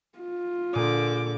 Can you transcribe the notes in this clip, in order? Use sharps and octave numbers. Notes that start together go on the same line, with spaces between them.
F4
A#2 D3 G#4 D6